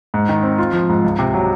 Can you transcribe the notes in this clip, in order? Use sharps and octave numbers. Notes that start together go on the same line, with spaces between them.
G#2
D#3
C4
F4
F3
G#2
C#2
C3
F#3